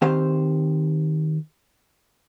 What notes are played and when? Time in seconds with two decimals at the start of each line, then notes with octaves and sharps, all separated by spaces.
0.02 D#3 C4 G4 C5 F5